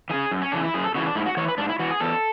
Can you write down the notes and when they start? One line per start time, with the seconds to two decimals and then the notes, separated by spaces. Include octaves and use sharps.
0.10 C#3 E3 G#4
0.31 F#2
0.42 C#4
0.52 C#3 E3 D4
0.63 E4
0.74 F#2 G#4
0.84 A4
0.95 C#3 E3 F#4
1.06 D4
1.15 G#2 E4
1.26 F#4
1.37 E3 C#5
1.48 B4
1.58 G#2 D4
1.69 E4
1.79 E3 F#4
1.91 G#4
2.00 E2 A4